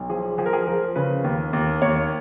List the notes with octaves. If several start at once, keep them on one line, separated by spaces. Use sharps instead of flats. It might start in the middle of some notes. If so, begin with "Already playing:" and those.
Already playing: B1
F3 G#4
F3 G#4
A#4
G#4
F3 A#4
C#3 B4
D#2
D#2
D#2 C#5